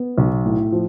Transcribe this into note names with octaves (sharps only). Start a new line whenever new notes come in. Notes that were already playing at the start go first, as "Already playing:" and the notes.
Already playing: B3
B1
A2
F3